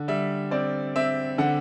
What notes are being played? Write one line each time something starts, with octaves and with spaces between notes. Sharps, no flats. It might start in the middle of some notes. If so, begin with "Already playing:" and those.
Already playing: D3
G3 E5
C4 D5
C4 E5
D3 F#5